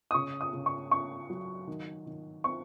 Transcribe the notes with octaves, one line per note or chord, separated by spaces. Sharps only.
D#6
C#3 C#6
D#6
C#3
C#6
C#4 C#6
F#3
D#3
D#3
C4 C#6